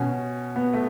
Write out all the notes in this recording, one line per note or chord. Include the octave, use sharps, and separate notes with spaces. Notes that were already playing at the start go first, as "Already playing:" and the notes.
Already playing: B2 C#4
B3
A3